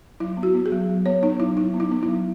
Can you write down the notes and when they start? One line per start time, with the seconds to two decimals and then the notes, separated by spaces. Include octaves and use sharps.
0.20 F#3 E4
0.37 B3
0.43 F#4
0.55 B3
0.66 G#4
0.72 F#3
0.89 F#3
1.06 B3 C#5
1.23 B3 D#4
1.40 F#3 E4
1.57 F#3 D#4
1.74 B3
1.80 E4
1.91 B3
2.03 E4
2.08 F#3